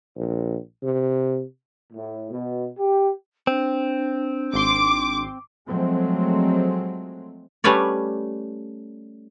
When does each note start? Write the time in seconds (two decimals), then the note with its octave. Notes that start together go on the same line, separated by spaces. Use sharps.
0.17 A#1
0.83 C3
1.93 A2
2.31 B2
2.79 G4
3.47 C4 D4
4.54 G#1 C6 D6
5.68 F3 F#3 G#3 A3 C4
7.64 G3 A3 C#4 B4 C#5 D5